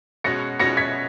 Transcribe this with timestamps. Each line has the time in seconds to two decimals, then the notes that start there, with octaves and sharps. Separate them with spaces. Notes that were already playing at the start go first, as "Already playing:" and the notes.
0.24 B2 G#3 C#4 F#4 A#6 C#7
0.59 B2 G#3 C#4 F#4 A#6 C#7
0.77 G#6 B6